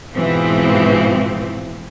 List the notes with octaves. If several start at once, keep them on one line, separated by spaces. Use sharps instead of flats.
G#2 B2 E3 F3 C4